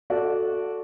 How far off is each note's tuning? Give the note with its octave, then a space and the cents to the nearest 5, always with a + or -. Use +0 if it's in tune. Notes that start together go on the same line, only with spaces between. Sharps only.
F#4 -15 A4 +0 D5 -20